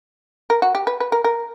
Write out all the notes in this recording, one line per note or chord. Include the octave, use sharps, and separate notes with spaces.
A#4
F#4
G4
B4
B4
A#4
A#4